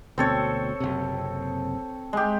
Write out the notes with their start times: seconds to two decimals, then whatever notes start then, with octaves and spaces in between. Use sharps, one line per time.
0.18 D2 B2 C4 A4 C#5
0.80 F#1 C3
2.13 G#3 G4